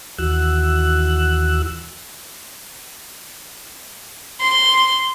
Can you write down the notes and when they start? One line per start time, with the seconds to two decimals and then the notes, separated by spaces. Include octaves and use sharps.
0.18 D#2 E3 F#4 E6 F#6
4.39 C6